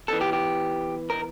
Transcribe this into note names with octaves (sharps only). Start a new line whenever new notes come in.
E2 E3 A4
G4
G4
A#4